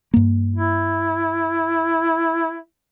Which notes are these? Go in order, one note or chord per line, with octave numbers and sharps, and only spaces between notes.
G2 A#3
E4